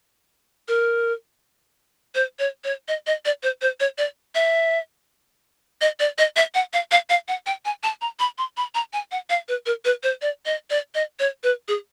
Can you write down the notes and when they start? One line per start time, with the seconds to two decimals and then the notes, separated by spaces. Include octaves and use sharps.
0.68 A#4
2.15 C5
2.39 C#5
2.64 C#5
2.88 D#5
3.07 D#5
3.25 D5
3.43 C5
3.62 C5
3.80 C#5
3.98 D5
4.35 E5
5.81 D#5
6.00 D5
6.18 D#5
6.36 E5
6.55 F#5
6.73 F5
6.91 F5
7.10 F5
7.28 F#5
7.46 G5
7.65 G#5
7.83 A5
8.01 A#5
8.20 B5
8.38 C6
8.57 B5
8.75 A#5
8.93 G#5
9.12 F#5
9.30 F5
9.49 B4
9.66 A#4
9.85 B4
10.03 C5
10.22 D5
10.46 D#5
10.70 D5
10.95 D#5
11.19 C#5
11.43 B4
11.68 G#4